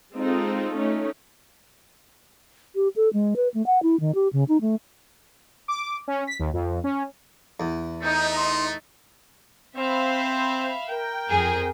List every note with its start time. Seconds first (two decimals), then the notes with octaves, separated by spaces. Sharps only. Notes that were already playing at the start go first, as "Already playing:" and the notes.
0.15 G#3 C4 D#4 F4 A4
0.77 A3 C#4 D#4
2.75 G4
2.96 A4
3.13 G#3
3.36 B4
3.54 A3
3.66 F#5
3.83 E4
4.00 D#3
4.15 G4
4.33 C#3
4.48 D#4
4.61 A3
5.68 D6
6.08 C#4
6.27 B6
6.39 D#2
6.54 F2
6.84 C#4
7.60 E2
8.03 A3 D#4 G6
8.36 C6
9.76 C4 C5 E5 F5 B5
10.89 A#4 G5
11.28 F2 G#4